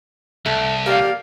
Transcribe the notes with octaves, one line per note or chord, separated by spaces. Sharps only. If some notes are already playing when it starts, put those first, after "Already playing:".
C2 A3
A#3 G4 D5 F5